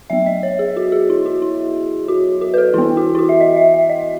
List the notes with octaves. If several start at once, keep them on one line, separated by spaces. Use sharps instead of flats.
F#3 B3 E5
D#5
C#5
G#4
F#4
G#4
E4
F#4
E4
F#4
F#4
B4
A4
E3 B3 E4
F#4
E4
F#4
E5
D#5
E5
E5
D#5